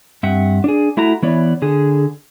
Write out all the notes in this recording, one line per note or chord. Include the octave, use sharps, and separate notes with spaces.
G2 C4 E5 F#5
D4 G#4
A3 E4 F#4 A#5
E3 B3 E4 C#5 D5
D3 G#4